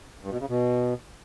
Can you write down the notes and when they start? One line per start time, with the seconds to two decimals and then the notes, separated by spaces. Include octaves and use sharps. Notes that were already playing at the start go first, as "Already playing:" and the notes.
0.22 G2
0.31 B2
0.40 C#3
0.49 B2